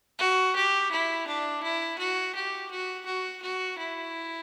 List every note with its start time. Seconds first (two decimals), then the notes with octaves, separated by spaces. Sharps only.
0.19 F#4
0.56 G4
0.91 E4
1.27 D4
1.63 E4
1.98 F#4
2.35 G4
2.71 F#4
3.06 F#4
3.42 F#4
3.78 E4